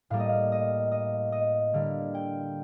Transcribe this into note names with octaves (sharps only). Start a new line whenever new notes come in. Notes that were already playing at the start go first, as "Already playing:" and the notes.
A2 G3 A#3 F5
D#5
F5
D#5
D#5
D#5
D3 G3 A#3 F5
G5